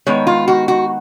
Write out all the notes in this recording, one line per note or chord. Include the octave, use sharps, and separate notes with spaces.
D#3 G#3 B3 D#4 C#5
F4
F#4
F#4